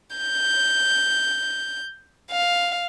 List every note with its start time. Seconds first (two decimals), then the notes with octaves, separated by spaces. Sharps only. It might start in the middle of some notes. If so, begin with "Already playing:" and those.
0.16 G6
2.31 F5